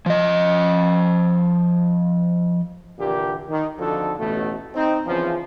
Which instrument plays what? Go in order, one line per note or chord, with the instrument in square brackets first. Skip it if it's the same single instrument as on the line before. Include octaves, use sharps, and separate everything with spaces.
[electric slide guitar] F3 D#5
[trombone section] A#2 D3 E3 A#3 G4
D#3
F2 D3 F3 D#4 F#4 A4
A1 B2 A3
C4 D#4
E2 C#3 E3 F3